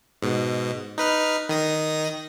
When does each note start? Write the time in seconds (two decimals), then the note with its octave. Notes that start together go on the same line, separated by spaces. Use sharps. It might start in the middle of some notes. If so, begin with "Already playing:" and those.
0.22 G#2 B2
0.98 D#4 B4 F6
1.49 D#3 D#6 A#6